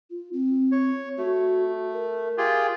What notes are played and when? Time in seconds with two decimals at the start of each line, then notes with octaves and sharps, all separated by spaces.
0.10 F4
0.33 C4
0.72 C#5
1.18 A3 F#4
1.93 A#4
2.38 F4 G4 G#4